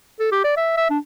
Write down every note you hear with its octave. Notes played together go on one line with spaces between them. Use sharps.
A4
G4
D5
E5
E5
D4